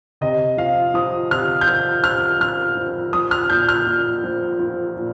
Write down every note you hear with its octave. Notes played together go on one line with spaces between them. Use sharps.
C3 D#5
F3 F5
F3 D#6
C3 F6
G6
F3 F6
F3 F6
F3 F6
F3
F3 D#6
F6
A#2 G6
F6
A#2
F3
F3
A#2